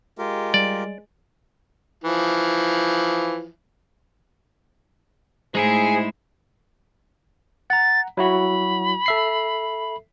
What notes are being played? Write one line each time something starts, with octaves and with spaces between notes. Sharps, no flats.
G#3 F4 G4 A#4
G3 D5
E3 F3
A2 G#3 D#4 E4 G#4 C5
F#5 A#5 A6
F#3 E4 F#4 B5
A4 E5 C7